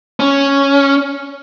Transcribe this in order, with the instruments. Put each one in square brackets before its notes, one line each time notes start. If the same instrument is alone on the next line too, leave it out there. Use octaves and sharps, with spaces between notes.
[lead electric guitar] C#4